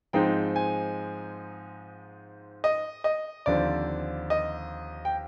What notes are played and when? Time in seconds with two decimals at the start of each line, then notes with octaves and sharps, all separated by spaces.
0.13 G#2 F3 G#3 C4 D#4 G5
0.56 G#5
2.64 D#5
3.04 D#5
3.46 D#2 D3 F3 C4 D5
4.30 D#5
5.05 G5